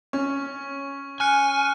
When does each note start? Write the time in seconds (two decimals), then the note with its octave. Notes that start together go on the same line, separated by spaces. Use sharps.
0.13 C#4 C#6
1.20 G#5 F6 F#6 C#7